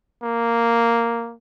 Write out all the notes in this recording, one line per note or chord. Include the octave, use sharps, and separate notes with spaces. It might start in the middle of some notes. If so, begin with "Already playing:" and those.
A#3